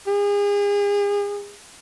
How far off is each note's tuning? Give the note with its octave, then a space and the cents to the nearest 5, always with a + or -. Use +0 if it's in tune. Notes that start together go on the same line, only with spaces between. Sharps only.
G#4 -35